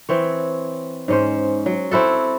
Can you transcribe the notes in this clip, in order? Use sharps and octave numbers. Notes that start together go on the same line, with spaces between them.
E3 C4 C#5
G#2 C#4 C5
F#3
C4 E4 F#4 A4